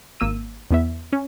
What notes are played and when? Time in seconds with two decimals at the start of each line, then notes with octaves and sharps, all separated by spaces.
0.20 G#1 A#3 E6 D#7
0.71 E2 B3 E5
1.12 C#4